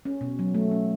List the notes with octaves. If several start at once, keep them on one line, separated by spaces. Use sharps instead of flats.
C#4
B2
F#3
A3
C#4